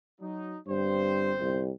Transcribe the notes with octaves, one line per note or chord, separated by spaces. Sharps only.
F#3 D#4
G1 G2 C4 C5
C2